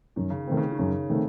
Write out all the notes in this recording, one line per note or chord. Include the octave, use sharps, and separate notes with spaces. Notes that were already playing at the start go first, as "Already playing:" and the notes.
F#2 D#3
C#3
D#3 A3 C4
C#3
D#3
F#2 C#3
D#3 A3 C4